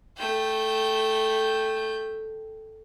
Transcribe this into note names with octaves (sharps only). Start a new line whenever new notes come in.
A3 G5